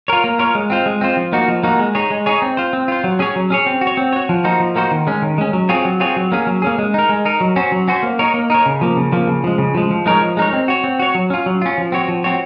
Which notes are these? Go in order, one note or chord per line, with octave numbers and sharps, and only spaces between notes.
F4 A#4 C#5
A#3
F4 A#4 C#5
G#3
C4 F4 C5
G#3
C4 F4 C5
F3
A#3 D#4 F#4
F3
A#3 D#4 F#4
G#3
D#4 G#4 C#5
G#3
D#4 G#4 C#5
C4
F4 C5
C4
F4 C5
F#3
C#4 G#4 C#5
F#3
C#4 G#4 C#5
C4
F#4
C#5
C4
F#4 C#5
F3
A#3 D#4 F#4 C5
F3
A#3 D#4 F#4 C5
D#3
G#3 C#4
D#3
G#3 C#4
F#3
C4 F4 G#4 C#5
F#3
C4 F4 G#4 C#5
F#3
A#3 C#4 G#4
F#3
A#3 C#4 G#4
G#3
D#4 A#4
G#3
D#4 A#4
F#3
C#4 F#4 C5
F#3
C#4 F#4 C5
A#3
D#4 A#4 C#5
A#3
D#4 A#4 C#5
C#3
F3 A#3
C#3
F3 A#3
C#3
F3 G#3
C#3
F3 G#3
F3
G#3 D#4 A#4 C#5
F3
G#3 D#4 A#4 C#5
C4
F#4 C#5
C4
F#4 C#5
F#3
C#4 F4
F#3
C#4 F4
F3
C4 F#4 C#5
F3
C4 F#4 C#5